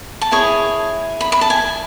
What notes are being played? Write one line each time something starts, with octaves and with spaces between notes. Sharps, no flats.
A5
E4 G#4 C#5 G#5
B5
B5
A5
G#5